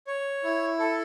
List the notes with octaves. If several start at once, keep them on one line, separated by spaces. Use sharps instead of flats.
C#5
E4
A4